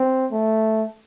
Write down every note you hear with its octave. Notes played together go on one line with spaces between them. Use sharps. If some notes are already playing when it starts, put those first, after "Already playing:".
Already playing: C4
A3